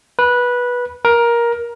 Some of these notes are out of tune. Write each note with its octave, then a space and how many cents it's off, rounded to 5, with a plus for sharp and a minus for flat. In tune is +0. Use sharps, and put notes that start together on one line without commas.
B4 -15
A#4 +15